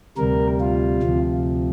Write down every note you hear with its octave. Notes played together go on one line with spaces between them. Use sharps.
D2 C3 G3 A#4
F4
D2 C3 F3